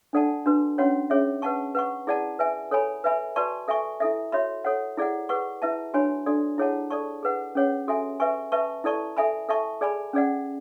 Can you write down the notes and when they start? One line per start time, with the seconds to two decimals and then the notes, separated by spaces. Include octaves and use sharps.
0.13 D4 A4 D5 F#5 A5
0.46 D4 F#4 B4
0.78 C#4 F#4 C#5 F#5 B5
1.10 C#4 G#4 C#5 E5
1.42 B4 F#5 A5 C#6
1.75 B4 F#5 C#6
2.07 E4 G#4 D5 F#5 A5
2.39 B4 E5 G#5
2.71 A4 C#5 G#5 B5
3.04 B4 E5 G#5 B5
3.36 F#4 B4 D5 A5 C#6
3.68 A4 E5 G#5 C#6
4.00 E4 A4 E5
4.32 F#4 C#5 E5 B5
4.65 A4 C#5 F#5
4.97 E4 G#4 D5 F#5
5.29 G#4 B4 F#5 C#6
5.62 E4 B4 E5 A5
5.94 D4 F#4 C#5 G#5 B5
6.26 D4 F#4 A4 D5
6.58 E4 G#4 C#5 F#5 A5
6.90 A4 D5 A5 C#6
7.23 G#4 B4 F#5
7.55 C#4 G#4 C#5 F#5
7.88 F#4 A4 E5 G#5
8.20 B4 E5 G#5 C#6
8.52 B4 E5 A5 C#6
8.84 E4 A4 D5 A5 C#6
9.17 A4 E5 G#5 B5
9.49 A4 E5 A5 C#6
9.81 G#4 D5 G#5 B5
10.13 C#4 G#4 D5 F#5